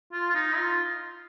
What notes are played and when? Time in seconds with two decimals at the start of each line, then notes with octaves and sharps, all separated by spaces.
0.13 F4
0.30 F4
0.35 D#4
0.56 F4